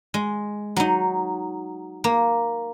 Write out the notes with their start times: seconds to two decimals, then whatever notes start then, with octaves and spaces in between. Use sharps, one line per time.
0.14 G#3
0.76 F#3 D#4
2.04 A#3